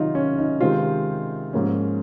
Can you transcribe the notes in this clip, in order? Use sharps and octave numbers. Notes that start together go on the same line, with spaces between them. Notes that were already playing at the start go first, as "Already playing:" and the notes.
Already playing: C3 D#3 F#3 D#4 F4
C#4
D#4
C3 D#3 G#3 C4 F4
G#2 F3 A#3 C#4